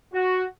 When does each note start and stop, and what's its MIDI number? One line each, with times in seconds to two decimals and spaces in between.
0.13 0.44 66